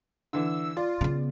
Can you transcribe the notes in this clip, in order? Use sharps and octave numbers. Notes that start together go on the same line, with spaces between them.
D3 E3 E6
F4 D5
C#3 B3